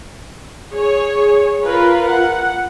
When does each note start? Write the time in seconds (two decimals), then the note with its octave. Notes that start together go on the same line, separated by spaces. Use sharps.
0.71 G#4 C#5
1.64 F4 A#4 B4
2.08 F#5